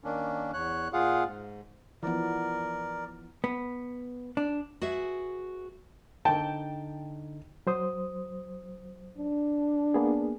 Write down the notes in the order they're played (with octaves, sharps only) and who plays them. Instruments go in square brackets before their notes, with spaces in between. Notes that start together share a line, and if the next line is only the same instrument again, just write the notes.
[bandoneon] D#3 A#3 C#4 D4
E2 C#5 F#6
A#2 F4 G#4 F5 F#5
G#2
[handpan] E3 F3 B3 [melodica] A#4 D5
[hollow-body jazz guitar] B3
D4
[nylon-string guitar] F#4 G#4 B4 E5
[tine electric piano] D3 D#4 [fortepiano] G5 A5
[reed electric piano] F#3 C5 D#6
[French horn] D4
[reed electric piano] A#3 B3 G#4